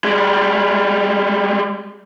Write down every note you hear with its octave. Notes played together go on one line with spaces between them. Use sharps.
G3 G#3